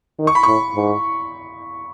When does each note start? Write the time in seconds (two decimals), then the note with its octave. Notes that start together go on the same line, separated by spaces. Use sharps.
0.19 D#3
0.27 C#6
0.35 B5
0.43 A2 C#6
0.75 G#2